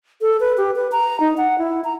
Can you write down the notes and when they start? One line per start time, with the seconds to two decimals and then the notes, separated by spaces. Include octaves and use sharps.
0.21 A4
0.40 B4
0.57 G4
0.76 B4
0.92 A#5
1.20 D#4
1.37 F#5
1.58 E4
1.84 A#5